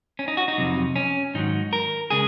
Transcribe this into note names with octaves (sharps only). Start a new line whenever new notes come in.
C#4
D#4
F#4
D#4
F2 C3 F#3
C#4
G#2 D#3 F#3 D#4
A#4
C#3 G#3 G#4